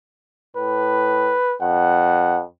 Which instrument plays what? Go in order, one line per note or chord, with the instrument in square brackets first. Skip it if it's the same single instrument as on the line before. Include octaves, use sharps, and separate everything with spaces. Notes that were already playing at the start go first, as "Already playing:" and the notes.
[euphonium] A2 [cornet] B4
[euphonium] F2 [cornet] F#5